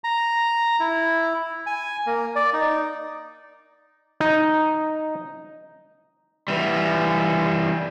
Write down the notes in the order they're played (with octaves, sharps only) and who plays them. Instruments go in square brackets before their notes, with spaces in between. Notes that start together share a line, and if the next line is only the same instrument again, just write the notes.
[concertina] A#5
E4
G#5
A#3
D5
D#4
[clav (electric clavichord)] D#4
[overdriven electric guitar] E3 G3